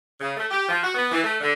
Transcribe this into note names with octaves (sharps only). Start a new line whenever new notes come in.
C#3
A3
G4
F3
F#4
B3
E3
A3
D3